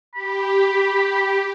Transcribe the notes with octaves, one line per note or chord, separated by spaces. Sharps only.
G4 B5